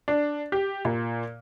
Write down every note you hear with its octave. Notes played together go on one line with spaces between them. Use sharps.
D4
G4
A#2